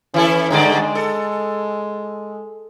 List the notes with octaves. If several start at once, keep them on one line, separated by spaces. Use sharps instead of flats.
E3 C#4 E4 A4
G2 D3 G#3 D5
A4